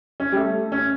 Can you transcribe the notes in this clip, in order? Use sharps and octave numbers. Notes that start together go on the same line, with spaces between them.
C#4
G3
A3
C#4